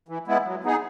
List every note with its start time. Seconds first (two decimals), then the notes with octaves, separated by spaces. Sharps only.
0.09 E3
0.27 G#3 B3 E4
0.46 F#3
0.64 B3 D#4 G#4